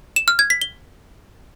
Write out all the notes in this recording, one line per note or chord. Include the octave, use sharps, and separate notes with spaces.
E7
F6
G#6
B6
G7